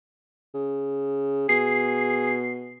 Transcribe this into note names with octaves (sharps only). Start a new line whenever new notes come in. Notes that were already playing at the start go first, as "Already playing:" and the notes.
C#3
B2 G#4 C7